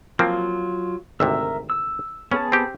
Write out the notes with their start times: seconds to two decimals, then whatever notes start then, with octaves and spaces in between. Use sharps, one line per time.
0.19 F3 F#3 A#3 C4 F4
1.20 G#1 D2 C3 A#4 E5 E6
1.70 E6
2.32 B3 C#4 G#4 A5
2.52 C4 G4